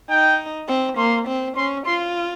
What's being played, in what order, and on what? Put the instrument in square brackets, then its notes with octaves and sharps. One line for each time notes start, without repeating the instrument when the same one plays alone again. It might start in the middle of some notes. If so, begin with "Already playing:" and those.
[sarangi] D#4 [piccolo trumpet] G5
[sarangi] C4
[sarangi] A#3 [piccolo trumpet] C6
[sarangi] C4
[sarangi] C#4 [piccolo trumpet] C6
[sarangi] F4 [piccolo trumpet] C6